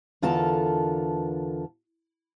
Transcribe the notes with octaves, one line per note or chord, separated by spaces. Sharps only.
E2 D3 F4 A4 A#4 A5